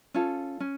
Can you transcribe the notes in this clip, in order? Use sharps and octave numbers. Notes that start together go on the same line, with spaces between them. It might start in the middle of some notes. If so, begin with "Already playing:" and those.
C#4 F4 A4
C#4